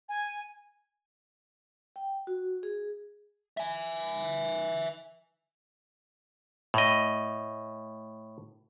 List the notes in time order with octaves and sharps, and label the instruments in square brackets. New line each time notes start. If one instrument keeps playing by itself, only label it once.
[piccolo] G#5
[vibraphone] G5
F#4
G#4
[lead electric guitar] E5 G#5
[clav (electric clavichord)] A2 D#5